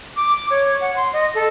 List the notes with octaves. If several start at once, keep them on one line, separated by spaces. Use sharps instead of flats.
D6
C#5
F#5
C6
D#5
A4